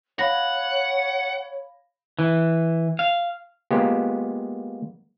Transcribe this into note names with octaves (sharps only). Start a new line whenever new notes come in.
C#5 F5 F#5 B5 A#6
E3
F5
G#3 A#3 B3 F4 G4